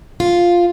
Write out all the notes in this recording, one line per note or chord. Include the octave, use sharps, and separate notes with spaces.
F4